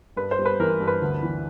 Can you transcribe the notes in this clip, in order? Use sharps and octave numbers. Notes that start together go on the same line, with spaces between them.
G2 B4
C5
G3
B4
E3 A#4
G2
B4
D2
E3